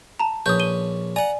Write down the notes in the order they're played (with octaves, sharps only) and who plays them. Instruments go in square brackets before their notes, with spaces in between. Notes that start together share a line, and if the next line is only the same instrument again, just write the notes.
[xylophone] A5 A#5
[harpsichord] A#1 C#4 B4 [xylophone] D#6 G6
[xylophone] D#7 G7
[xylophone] D5 G#5 [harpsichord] F#5 A#5